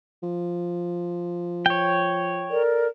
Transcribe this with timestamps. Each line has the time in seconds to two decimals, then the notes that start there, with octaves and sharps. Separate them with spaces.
0.23 F3
1.66 C#5 G5
2.49 A4 A#4 D5